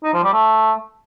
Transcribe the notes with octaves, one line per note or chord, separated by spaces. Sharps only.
D#4
F3
G3
A3